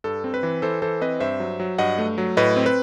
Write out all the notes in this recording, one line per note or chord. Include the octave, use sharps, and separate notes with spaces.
G2 A4
C4
B4
E3
E3 A4 C5
E3 A4 C5
C4 B4 D#5
G2 C5 E5
F#3
F#3
G2 D#5 F#5
A3
F#3
A2 B4 D#5
C4
B4